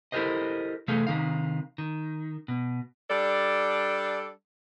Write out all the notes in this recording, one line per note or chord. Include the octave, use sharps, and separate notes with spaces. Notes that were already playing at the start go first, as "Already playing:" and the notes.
E4 G4 A4 A#4 C5 D#5
C3 E3 A3 G#4 A4 F5
C3 D#3 D#4 F5
D#3
B2
G3 D4 A4 D5